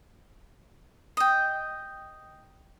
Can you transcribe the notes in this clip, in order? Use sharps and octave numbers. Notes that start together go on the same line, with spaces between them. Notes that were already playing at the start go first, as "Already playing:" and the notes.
D#5 G5